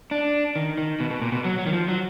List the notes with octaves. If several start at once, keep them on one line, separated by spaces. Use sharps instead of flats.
D4
D#3
D#3
B2
B2
A#2
B2
F#3
F#3
D#3
F3
F#3